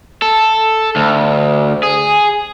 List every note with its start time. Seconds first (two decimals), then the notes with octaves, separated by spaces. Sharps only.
0.22 A4
0.96 D2
1.83 G#4